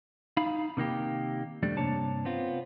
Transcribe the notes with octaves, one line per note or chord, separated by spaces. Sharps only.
D#4 F5 B5
C3 D#3 A#3 G4
C2 F2 G3 A3 D4
G2 C3 A#3 D4 C#5 A5
B3 C4 F4